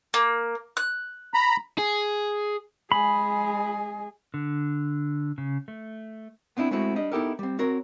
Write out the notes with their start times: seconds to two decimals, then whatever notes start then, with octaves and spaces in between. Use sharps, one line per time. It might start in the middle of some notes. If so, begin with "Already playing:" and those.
0.14 A#3
0.77 F#6
1.34 A#5 B5
1.78 G#4
2.92 G#3 G#4 B5
4.34 D3
5.38 C#3
5.68 A3
6.57 B3 C4 D4 E4
6.71 G#3 A3 B3 C4 E4 F#4
6.96 G3 D4 D#5
7.12 B3 D#4 E4 G4 A4 A#4
7.39 G3 C4
7.59 C4 F#4 A#4 C#5